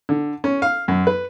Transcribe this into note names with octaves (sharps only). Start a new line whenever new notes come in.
D3
C#4
F5
F#2
B4